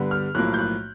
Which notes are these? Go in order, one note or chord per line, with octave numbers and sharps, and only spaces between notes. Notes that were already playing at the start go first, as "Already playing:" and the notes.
Already playing: G2 D3 G3 B3
F6
B1 A2 F3 A#3 F#6
G6
F#6